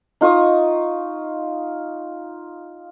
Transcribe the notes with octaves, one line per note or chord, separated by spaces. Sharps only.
D#4 F4 C#6 D#6